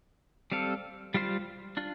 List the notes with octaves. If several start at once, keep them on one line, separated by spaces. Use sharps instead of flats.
G3 C4 A4 F5
G3 F4 C5 F5
D4 F4